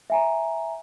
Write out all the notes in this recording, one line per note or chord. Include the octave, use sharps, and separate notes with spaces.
E5 G#5 A#5